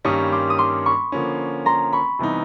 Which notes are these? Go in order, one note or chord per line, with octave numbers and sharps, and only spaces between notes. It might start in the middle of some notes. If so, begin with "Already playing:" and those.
G2 D#3 G3 A#3 C#4 C#6 D#6
C6 D6
D#6
C6 D6
B5 C#6
D3 F3 A#3 C#4
A#5 C6
B5 C#6
C3 E3 G3 B3 D#4